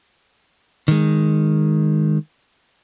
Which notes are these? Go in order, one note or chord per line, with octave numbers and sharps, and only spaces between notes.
D#3 G#3